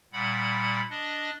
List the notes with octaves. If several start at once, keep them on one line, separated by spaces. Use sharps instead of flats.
A#2 G3 F#5 B5
D4 D#5